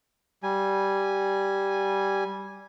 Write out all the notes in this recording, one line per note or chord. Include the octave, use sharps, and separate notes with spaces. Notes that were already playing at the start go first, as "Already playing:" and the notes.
G3 G#5